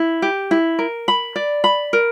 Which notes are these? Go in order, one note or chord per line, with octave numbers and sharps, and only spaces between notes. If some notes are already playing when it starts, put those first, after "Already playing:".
Already playing: E4
G4
E4
A#4
B5
D5
B5
A#4